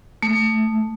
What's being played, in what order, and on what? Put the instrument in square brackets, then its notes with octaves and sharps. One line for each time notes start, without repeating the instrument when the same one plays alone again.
[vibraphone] A3